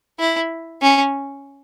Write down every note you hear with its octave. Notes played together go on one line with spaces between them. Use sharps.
E4
C#4